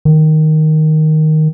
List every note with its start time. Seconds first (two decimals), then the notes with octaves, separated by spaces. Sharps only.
0.05 D#3